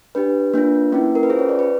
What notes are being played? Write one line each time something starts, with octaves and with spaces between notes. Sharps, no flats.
D4 G4 B4
A#3 D4 F4
A#3 C#4 E4
A#4
B4
C#4 F4 G#4 C5
C#5
D5
B4